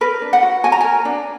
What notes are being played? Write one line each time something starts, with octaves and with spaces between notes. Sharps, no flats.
A#4 B4
D4
F#5
F#4
F#4 G#5
A#5
A#4 G#5
D4